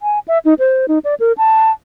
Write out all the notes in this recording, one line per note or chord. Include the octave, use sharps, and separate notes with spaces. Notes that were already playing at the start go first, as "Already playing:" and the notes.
G#5
E5
D#4
C5
D#4
D5
A#4
A5